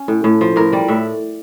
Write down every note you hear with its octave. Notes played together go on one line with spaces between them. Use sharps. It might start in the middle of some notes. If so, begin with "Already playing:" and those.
Already playing: C#4
A2
A2
F3
A2 A#4
G3 D5
A2 E5